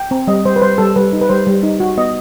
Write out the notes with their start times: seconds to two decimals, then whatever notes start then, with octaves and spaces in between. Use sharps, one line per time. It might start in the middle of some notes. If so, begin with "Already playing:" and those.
Already playing: G5
0.11 C4
0.28 G3 D#5
0.45 G3 C5
0.56 B4
0.62 G3 C5
0.78 G3 A4
0.96 G3 B4
1.13 D#4
1.21 B4
1.29 G3 C5
1.47 G3
1.63 D#4
1.80 F#4
1.97 B3 D#5